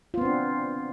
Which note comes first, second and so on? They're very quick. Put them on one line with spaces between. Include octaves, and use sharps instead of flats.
F4 B3 C4 D4